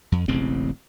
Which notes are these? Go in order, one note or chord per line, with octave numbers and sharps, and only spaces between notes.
F2
E1 A1 C#3 C4